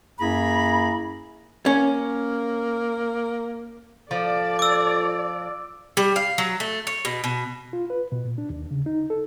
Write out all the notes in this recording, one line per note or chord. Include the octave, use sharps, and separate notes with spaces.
F#2 A#3 E4 G#4 A#5 B5
A#3 C#4
F3 A4 D5
D6 E6
G3
F5
F#3
A3
C#5
B2
B2
F4
B4
B2
A#2
D4
D#2
C#3
D#4
A4